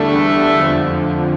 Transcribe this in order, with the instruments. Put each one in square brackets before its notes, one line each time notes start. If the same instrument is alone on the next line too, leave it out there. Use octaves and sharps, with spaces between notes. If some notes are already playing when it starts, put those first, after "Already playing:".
Already playing: [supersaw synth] E2 D3 G3 D4 [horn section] A3
[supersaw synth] F2 D3 F3